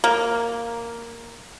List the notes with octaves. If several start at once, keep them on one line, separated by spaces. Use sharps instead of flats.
A#3